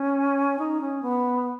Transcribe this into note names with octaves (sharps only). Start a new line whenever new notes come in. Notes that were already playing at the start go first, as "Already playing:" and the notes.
Already playing: C#4
D#4
C#4
B3